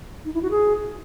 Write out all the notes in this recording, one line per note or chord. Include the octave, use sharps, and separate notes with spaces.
D#4
E4
F#4
G#4